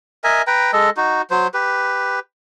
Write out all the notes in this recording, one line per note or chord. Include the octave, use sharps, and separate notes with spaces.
A#4 D#5 E5 G#5
B4 G5 A#5
G#3 A4 D#5
D#4 F#4
F#3 C5
G4 B4